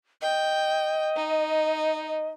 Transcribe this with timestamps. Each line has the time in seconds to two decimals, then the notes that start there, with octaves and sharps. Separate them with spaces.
0.22 D#5 G5
1.16 D#4